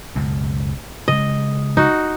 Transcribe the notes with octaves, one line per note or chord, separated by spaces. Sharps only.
C#2 F#2 B2
C#3 G#3 D#5
D#4 F#4